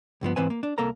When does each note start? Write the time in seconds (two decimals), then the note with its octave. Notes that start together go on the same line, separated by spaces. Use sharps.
0.21 C#2 G2 F3 B3
0.36 G#2 E3 C4 B4 C5 G#5
0.50 A#3
0.63 D4
0.78 C2 A#3 A4 A#4 A#5